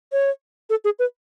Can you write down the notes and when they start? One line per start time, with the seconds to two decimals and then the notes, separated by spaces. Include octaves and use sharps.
0.12 C#5
0.70 A4
0.85 G#4
0.99 B4